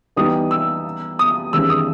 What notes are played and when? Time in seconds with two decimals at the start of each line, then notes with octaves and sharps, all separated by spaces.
0.16 E3 G3 B3 D#4 G4 D#6
0.51 E6
1.19 D#6
1.53 E2 D#3 G3 C#4 G#4 E6
1.70 D#6